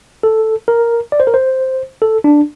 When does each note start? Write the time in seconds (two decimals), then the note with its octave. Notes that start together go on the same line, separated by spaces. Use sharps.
0.23 A4
0.68 A#4
1.12 D5
1.20 C5
1.27 A#4
1.34 C5
2.02 A4
2.24 D4